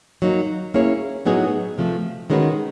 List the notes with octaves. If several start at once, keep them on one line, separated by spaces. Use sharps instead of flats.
F#3 A#3 D#4
A#3 C#4 E4 G#4 C#5
A2 F#3 B3 D#4 G#4
C3 F3 A3
D#3 G#3 C#4 F#4 B4